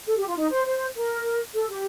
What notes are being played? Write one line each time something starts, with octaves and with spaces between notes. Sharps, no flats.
A4
G4
F4
D#4
C5
C5
A#4
A4
G4